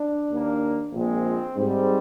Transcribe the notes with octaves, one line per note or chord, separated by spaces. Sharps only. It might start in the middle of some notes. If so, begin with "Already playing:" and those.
Already playing: D4
D#2 D#3 A#3
A#1 A#2 G#3 C4
G#2 G3 C4